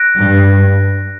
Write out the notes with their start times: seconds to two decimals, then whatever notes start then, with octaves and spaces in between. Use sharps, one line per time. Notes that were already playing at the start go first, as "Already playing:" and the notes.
Already playing: F#6 A#6 D7
0.19 G2